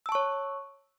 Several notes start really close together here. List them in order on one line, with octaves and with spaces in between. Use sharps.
E6 A5 C#6 C#5